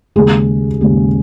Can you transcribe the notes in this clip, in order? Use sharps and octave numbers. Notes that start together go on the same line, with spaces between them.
D#2 C#3 G#3 G#4
D#2 C#3 G#3